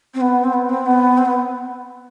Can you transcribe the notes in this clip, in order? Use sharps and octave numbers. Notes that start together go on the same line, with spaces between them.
C4
B3
C4
B3
C4
B3
C4
B3